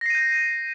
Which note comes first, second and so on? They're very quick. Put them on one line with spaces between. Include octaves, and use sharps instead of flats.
A#6 C7 D#7 G6